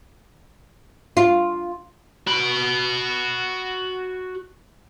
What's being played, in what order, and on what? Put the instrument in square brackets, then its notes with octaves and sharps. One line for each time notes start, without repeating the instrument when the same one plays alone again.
[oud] F4
[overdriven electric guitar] F#4 B5